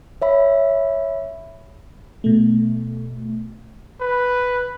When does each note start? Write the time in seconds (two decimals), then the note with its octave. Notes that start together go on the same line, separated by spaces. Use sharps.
0.22 C#5 E5 B5
2.24 B2 A3
4.01 B4